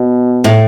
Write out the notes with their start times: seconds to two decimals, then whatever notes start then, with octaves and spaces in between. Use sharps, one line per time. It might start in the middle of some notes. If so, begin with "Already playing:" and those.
Already playing: B2
0.44 A2